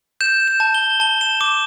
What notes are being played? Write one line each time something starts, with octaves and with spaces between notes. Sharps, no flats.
G6 E7
E7
A5
G7
A5 G7
E7
D6 E7